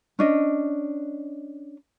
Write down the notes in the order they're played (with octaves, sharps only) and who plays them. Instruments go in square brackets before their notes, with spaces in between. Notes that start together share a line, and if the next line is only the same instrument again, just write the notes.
[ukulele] C#4 D4 D#5